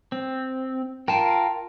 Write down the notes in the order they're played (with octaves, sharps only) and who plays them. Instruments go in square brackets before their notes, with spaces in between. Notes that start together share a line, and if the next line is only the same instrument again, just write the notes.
[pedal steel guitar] C4
[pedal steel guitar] F4 A#4 [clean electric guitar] G5 A5